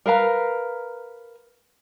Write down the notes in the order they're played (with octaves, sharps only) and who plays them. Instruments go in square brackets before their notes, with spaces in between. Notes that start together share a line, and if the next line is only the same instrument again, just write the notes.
[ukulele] A#4 B4 F5 A#5